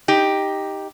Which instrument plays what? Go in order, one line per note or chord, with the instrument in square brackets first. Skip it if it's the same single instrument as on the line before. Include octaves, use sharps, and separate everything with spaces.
[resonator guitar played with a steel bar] D#4 G4